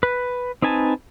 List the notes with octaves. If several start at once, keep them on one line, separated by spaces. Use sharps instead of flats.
B4
C4 D#4 B4 G#5 A5